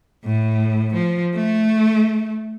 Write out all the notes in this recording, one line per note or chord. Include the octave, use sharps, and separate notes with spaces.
A2
F3
A3